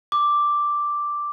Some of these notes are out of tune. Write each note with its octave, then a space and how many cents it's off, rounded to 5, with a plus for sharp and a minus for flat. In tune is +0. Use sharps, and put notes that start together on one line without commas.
D6 +0